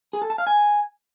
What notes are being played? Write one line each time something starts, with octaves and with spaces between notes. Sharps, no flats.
G#4
A4
A5
F5
G#5